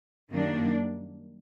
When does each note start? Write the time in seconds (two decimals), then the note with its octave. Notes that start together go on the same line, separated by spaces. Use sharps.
0.32 F#2 D#3 G3 A#3 D4